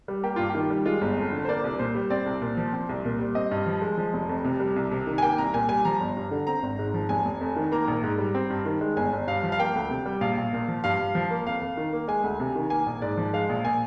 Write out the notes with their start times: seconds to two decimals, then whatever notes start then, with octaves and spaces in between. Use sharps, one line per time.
0.08 G3
0.23 A#3 G4
0.36 G2 F4
0.50 G4
0.55 D#3
0.70 G3
0.86 G#3 F4
1.01 G1
1.17 F2
1.32 D3
1.45 C5
1.48 A#3 D5
1.64 C2
1.79 A#2 C5
1.95 G3
2.10 C4 D5
2.26 C2
2.41 A#2
2.57 F3
2.73 C4
2.89 C2
3.05 A#2
3.19 G3
3.35 C4 D#5
3.51 G2
3.66 F3
3.82 G#3
3.98 F3
4.13 F1
4.29 F2
4.45 C3
4.60 G3
4.76 C2
4.92 C3
5.07 D#3
5.18 G#5
5.22 A#3 G5
5.38 C2 A#5
5.53 A#2 G#5
5.69 G3 G#5
5.85 F3 A#5
6.00 G1
6.17 G2
6.31 D3
6.47 C4 A#5
6.63 G#1
6.79 G#2
6.94 F3
7.09 F1 G#5
7.25 F1
7.41 F2
7.56 D#3
7.72 A#3 A#5
7.88 A#1
8.03 G#2
8.18 G3
8.35 C4
8.50 G2
8.66 D#3
8.81 G#3
8.97 G1 G#5
9.13 G1
9.27 G2 F5
9.43 F3
9.52 F5
9.59 A#3 G5
9.75 D2
9.90 C3
10.06 G3
10.21 A#1 F5
10.38 A#1
10.53 A#2
10.68 F3
10.84 G2 F5
10.99 G2
11.15 F3
11.31 A#3
11.46 F2 F5
11.61 F2
11.77 D#3
11.93 A#3
12.08 G#3 G#5
12.23 D2
12.40 C3
12.56 D#3
12.70 A#3 G#5
12.86 A#1
13.02 G#2 D5
13.17 F3
13.33 G#3 F5
13.49 A#1
13.64 A#2 G#5